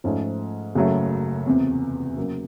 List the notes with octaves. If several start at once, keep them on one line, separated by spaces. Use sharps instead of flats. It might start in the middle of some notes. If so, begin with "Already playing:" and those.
G#2 F3 A3 C#4 F4
F#1 F#2 C#3 F#3 A3
F1 E2 C3
C#3 F#3 A#3